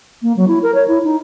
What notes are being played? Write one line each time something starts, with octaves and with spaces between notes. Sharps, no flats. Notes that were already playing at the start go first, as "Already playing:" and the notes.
A#3
F#3
E4
A#4
C#5
E4
D#4